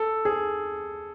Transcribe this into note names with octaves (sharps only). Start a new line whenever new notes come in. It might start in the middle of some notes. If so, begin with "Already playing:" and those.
Already playing: A4
G#4